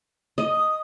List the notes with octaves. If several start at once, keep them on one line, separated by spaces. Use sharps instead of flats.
D#5
D#6